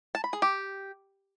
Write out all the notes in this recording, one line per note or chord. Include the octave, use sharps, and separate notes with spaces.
A5
B5
G#4
G4